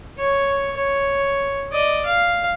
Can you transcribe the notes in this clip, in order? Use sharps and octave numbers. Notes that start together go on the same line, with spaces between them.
C#5 C#6
C#5
D5 D#5
F5